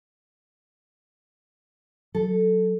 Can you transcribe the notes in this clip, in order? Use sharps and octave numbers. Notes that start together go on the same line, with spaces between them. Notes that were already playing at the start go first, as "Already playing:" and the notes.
F#3 A4